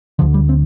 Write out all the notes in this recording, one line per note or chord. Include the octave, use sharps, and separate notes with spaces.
D2 D3 F3
G3
C4